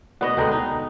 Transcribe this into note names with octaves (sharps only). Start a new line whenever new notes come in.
B2 B3 B4 D5 D#5 F#5
D2 B2 D3 G#3 G5 A#5
D#4